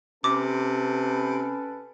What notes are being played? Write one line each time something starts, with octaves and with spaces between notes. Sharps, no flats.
C3 C#4 A4 B4 D6